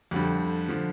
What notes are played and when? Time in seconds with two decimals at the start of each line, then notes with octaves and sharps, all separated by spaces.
0.11 F2 D3 G3
0.69 D3 F3